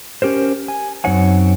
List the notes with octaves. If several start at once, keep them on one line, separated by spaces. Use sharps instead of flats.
C#4 G4 A#4 C5
G#5
F#2 C4 D#4 C#5 F#5 G#5